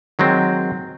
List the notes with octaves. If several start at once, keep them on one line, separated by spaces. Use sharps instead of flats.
D#3 F#3 G#3 C4